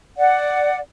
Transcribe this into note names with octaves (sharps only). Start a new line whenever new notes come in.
D5 F#5